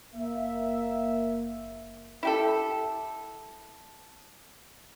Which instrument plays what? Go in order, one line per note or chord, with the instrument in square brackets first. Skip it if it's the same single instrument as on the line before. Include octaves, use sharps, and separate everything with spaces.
[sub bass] F#1 [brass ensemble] A#3 E5
[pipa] E4 G4 A4